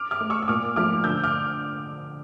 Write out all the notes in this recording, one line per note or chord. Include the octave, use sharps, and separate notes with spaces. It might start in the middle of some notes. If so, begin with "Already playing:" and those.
Already playing: D6 F6
D6 F6
A3
C#6 E6
E6
A#2 D6 F6
F3 A3 D6 F6
D3 E6 G6
D6 F6